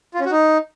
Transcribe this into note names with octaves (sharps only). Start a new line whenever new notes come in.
F4
C#4
F#4
D#4